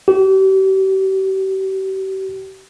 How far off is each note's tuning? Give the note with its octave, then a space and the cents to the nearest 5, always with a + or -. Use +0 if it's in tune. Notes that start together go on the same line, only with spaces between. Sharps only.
G4 -40